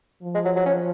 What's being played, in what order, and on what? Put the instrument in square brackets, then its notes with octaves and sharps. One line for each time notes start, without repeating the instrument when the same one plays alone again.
[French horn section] F3
[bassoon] G#3
F#3
F#3
C#4